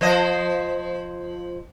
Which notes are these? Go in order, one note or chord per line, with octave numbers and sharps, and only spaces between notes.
F3 C5 D#5